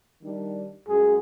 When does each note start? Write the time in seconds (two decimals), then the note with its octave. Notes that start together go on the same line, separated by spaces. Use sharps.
0.23 D#3 G3 D4
0.88 F#2 G#3 F#4 G#4